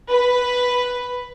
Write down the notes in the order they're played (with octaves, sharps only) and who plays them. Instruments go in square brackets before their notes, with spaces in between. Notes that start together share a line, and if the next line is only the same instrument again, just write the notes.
[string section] B4